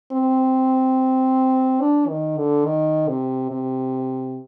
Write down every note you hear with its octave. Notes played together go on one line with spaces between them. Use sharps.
C4
D4
D#3
D3
D#3
C3
C3